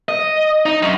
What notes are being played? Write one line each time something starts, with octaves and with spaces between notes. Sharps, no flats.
D#5
D#4
F#2